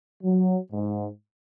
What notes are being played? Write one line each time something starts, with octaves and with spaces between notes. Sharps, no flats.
F#3
G#2